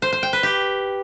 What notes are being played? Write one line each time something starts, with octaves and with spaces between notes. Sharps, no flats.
C5
C5
G5
B4
G4